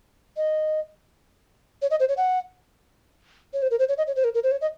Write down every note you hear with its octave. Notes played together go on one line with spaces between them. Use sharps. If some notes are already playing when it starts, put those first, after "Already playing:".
D#5
C#5
D#5
C5
C#5
F#5
C#5
C5
A#4
C5
C#5
D#5
C#5
C5
A#4
A#4
C5
C#5
D#5